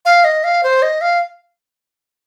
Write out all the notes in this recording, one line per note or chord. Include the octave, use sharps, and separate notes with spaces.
F5
D#5
F5
C5
D#5
F5